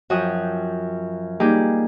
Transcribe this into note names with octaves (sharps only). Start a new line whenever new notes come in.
F#2 F3 F#4 G5 D#6
G3 A#3 D#4 F4 G4 G#4